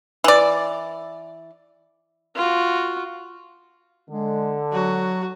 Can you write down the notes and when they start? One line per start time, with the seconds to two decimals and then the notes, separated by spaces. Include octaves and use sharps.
0.24 E3 D5
2.36 F4 F#4
4.10 D3 G#3
4.73 F#3 F#4